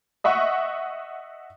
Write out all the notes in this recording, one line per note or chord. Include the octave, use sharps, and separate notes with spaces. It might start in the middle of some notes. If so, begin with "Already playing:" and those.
D#5 E5 F#5 C#6